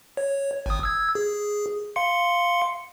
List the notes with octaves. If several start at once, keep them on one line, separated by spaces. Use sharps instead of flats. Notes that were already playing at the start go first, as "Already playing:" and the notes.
C#5
G#1 D#6
E6 G#6
G#4
F5 C6 C#7